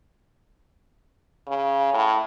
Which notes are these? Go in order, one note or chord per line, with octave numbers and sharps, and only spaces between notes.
C#3
A2